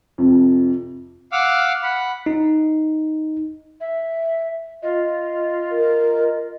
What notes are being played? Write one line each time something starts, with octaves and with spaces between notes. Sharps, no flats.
F2 C3
F5 F#5 D6 E6 F6
F#5 B5
D#4
E5
F4 D#5
A#4